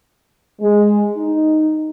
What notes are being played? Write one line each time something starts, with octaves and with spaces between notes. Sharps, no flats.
G#3
D#4